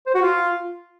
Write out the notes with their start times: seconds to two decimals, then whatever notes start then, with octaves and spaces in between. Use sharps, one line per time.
0.07 C5
0.15 F#4
0.22 F4